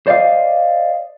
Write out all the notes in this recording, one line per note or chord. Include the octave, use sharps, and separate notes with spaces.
C5 D5 D#5 F5